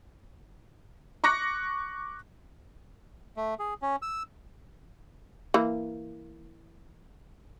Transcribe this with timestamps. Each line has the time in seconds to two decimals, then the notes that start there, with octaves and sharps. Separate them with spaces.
1.24 C#6 D6 F#6 A#6 C#7
3.37 A3
3.59 G#4
3.82 C#4
4.02 E6
5.54 E3 A#3